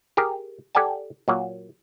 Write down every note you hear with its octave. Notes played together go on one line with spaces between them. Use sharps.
G4 G#4 A#4
G4 A4 D5 F#5 G#5 A5
A#2 F#3 A#3